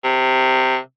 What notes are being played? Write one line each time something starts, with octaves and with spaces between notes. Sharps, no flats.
C3